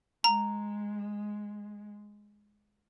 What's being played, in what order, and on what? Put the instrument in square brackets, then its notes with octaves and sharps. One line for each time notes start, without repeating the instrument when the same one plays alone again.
[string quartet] G#3 [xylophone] A#5